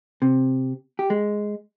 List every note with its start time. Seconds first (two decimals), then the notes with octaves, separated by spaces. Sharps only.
0.22 C3
0.99 G4
1.10 G#3